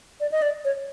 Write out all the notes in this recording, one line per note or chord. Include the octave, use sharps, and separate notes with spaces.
D5
D#5
D5
C#5